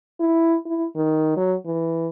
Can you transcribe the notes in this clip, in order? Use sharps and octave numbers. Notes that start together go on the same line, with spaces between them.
E4
E4
D#3
F#3
E3